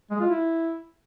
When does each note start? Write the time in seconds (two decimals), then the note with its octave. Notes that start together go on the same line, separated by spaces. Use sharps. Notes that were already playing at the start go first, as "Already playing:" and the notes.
0.11 G#3
0.20 F4
0.30 E4